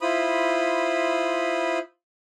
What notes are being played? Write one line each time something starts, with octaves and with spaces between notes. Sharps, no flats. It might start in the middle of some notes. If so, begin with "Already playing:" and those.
E4 F4 C5 B5 D#6